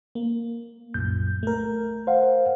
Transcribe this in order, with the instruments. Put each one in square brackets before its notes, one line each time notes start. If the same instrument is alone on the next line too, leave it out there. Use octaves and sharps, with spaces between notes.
[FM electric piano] A#3
[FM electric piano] C2 F#2 A#2 [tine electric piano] G6
[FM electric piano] A3 A#4
[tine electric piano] C5 F5 F#5